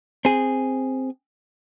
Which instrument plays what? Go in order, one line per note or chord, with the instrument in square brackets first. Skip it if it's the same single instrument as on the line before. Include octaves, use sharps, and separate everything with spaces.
[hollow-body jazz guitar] C4 G#4